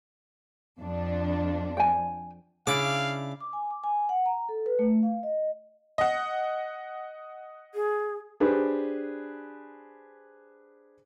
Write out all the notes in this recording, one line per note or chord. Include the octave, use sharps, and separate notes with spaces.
F2 D4
G5 G#5
C#3 D4 E4 D5 F5 D6
D6
G#5
D6
G#5
F#5
A#5
A4
B4
A3
F5
D#5
D#5 F#5
G#4
D4 G4 G#4 B4 C5